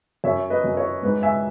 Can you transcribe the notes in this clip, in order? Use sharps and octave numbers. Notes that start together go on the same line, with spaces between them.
F#2 C#5 E5
B4 D#5
F#2
C#5
G#2 B4
E5 G#5